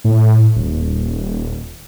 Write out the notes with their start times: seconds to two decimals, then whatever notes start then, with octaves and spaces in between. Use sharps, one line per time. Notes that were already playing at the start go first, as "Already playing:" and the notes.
0.04 A2
0.56 D#1